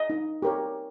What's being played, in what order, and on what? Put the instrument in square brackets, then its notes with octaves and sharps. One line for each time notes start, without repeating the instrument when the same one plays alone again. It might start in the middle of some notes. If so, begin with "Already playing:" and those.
Already playing: [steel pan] D#5
D#4
G4 A#4 C#5